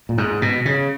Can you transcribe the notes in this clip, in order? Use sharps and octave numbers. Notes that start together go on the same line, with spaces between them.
A#2
G#2
B2
C#3